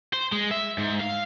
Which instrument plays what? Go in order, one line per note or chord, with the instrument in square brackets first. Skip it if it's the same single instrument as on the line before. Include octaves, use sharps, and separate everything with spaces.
[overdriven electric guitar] C5
G#3
E5
G#2
F5